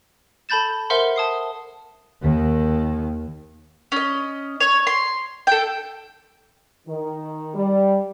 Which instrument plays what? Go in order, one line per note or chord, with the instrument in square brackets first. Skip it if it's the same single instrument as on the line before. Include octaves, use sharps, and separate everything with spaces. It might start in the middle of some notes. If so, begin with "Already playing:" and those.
[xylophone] A4 A5 B5 G6 A6 E7
A#4 C5 E5 F#5 C6
A5 D#6 C7
[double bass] D#2 D#3
[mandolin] C#4 D#5
C#5
C6
A4 G5
[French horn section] D#3
G3